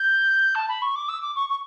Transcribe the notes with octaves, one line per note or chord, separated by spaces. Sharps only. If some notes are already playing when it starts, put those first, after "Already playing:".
Already playing: G6
A5
B5
C#6
D6
E6
D6
C#6
C#6